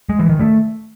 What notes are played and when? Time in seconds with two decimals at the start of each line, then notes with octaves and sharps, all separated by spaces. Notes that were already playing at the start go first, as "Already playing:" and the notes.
0.09 G#3
0.19 E3
0.29 D#3
0.39 A3